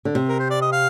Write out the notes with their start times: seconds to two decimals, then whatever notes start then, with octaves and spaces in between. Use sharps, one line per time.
0.05 D3
0.15 C3
0.28 A#4
0.39 C5
0.50 D5
0.62 D#5
0.72 F5